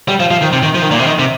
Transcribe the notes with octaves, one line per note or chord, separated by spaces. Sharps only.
G3
F3
F3
D#3
C3
D#3
F3
D#3
A#2
C3
D#3
C3